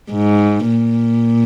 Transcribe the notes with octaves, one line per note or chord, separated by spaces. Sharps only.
G#2
A#2